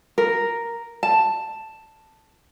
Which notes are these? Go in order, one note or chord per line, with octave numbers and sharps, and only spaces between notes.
A#4
A5